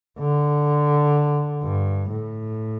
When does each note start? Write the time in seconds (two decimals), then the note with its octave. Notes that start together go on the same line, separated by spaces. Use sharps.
0.19 D3
1.62 G2
2.10 A2